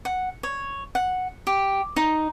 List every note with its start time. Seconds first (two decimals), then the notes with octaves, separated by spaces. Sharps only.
0.05 F#5
0.43 C#5
0.95 F#5
1.47 G4
1.96 D#4